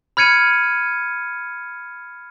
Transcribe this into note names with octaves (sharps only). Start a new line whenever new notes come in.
B5 F6 G#6 C#7 D#7